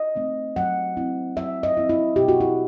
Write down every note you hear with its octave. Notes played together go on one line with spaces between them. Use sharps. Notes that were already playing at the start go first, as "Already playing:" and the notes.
Already playing: D#5
A3 C4 D#4
F#3 F#5
C4 E4
F#3 E5
D#5
C4 E4
E4
B2 G4
F#4
E4